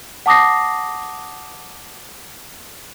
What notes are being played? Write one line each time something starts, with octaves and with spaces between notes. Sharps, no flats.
F#5 A5 D6 D#6 A#6 C7